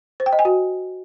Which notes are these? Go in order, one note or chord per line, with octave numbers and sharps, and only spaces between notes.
C5
G5
D#5
G#5
F#4